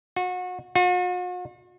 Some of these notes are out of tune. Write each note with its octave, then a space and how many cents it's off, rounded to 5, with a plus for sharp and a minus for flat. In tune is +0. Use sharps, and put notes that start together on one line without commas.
F#4 -30
F#4 -45